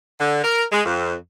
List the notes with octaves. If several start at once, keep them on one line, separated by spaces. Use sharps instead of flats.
D3
A#4
G#3
F2